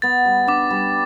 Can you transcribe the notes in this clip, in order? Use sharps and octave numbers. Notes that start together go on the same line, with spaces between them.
B3 A6
G3
D4 D6
G3